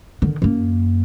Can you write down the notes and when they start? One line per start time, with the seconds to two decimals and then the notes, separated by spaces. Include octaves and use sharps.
0.22 D3 D#3
0.42 F#2 A#3